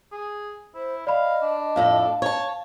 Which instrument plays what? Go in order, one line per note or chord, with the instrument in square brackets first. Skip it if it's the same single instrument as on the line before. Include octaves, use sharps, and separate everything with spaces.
[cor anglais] G#4
[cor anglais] E4 [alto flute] C5
[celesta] D5 B5 [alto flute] D#5 [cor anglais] F5
[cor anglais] D4
[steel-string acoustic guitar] F2 A2 A4 [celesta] F5
[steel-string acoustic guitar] C#5 A5